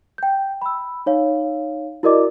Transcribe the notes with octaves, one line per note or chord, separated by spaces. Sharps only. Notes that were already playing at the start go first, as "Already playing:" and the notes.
G5 G6
B5 E6
D#4 C#5 F5
E4 F#4 A#4 D5 D#5 D6